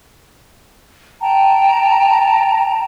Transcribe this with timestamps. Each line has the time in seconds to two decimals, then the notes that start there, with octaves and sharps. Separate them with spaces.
1.21 G5 A5 A#5